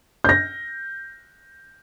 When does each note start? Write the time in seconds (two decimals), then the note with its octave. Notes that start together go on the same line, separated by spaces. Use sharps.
0.24 G6 A#6